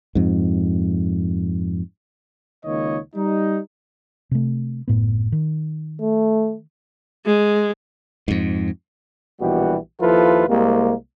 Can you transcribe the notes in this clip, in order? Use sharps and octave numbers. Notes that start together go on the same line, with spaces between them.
F2 G#2
C#2 D#3 A#3 C#5 D#5
G3 D#4
C3 A3
F#1 A2 B3
D#3
A3
G#3
F2 G#2
A#1 B2 E3 G3 F#4 G4
D#2 F3 E4 F4 A4 B4
C2 C3 G#3 A#3